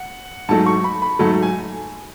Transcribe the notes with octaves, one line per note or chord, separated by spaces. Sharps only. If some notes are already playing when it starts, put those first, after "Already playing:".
Already playing: F#5
G#2 F#3 A3 A5
C#6
B5
B5
G#2 F#3 A3 A5
G#5